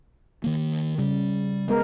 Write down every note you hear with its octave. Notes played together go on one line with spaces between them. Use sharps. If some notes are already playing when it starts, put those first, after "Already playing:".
D#3 A#3
C#3 G3
G#3 B3 A#4